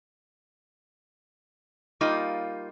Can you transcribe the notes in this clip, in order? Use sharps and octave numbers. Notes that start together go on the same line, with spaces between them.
G3 A#3 D#4 F4